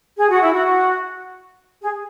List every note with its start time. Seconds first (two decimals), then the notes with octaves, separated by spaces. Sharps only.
0.18 G#4
0.29 F#4
0.41 E4
0.54 F#4
1.81 G#4